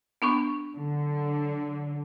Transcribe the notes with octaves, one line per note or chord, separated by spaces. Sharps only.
B3 D4 C#6
D3 F#3